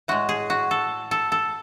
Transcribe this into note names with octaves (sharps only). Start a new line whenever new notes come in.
A2 G#3 F#4
G#4
F#4
A4
A4
A4